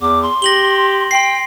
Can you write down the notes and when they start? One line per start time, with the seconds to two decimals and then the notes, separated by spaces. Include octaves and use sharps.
0.02 E2 D6
0.23 C6
0.42 G4 A#6 F#7 G7
1.11 G5 C6 C7